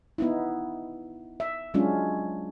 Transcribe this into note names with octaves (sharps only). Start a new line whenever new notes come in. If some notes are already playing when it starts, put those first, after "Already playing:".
B3 D#4 E4
E5
F#3 G#3 C#4 D4 F4